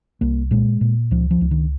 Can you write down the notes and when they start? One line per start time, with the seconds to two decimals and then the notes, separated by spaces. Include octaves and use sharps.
0.21 C2 A#3
0.51 A#2 G#3
0.81 A#2
1.11 C#2 F3
1.31 F3
1.41 C#2
1.51 D#3